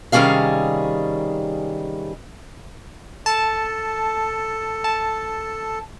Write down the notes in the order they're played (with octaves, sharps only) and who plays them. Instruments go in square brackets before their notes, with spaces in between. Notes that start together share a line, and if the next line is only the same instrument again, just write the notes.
[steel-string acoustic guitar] C3 D#3 G3 C#4 G#4 F5
[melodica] A4 [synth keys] A5
[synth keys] A5